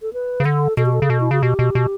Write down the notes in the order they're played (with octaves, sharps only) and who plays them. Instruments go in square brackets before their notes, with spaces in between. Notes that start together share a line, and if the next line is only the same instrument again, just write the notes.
[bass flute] A4
B4
[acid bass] C#3
[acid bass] D3 [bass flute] A4
[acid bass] B2 [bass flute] A4
[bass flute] G4
A4
[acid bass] C#3
B2
[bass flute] E4
[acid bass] C#3 [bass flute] F#4
[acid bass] B2 [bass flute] G4
[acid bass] B2
B2